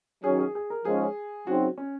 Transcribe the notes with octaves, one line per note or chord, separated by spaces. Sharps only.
D#3 F#3 C#4 G#4
G#4
G#4
A#4
G#2 F3 G#3 C#4 G#4
C#3 F#3 C4 D#4 F#4
C#4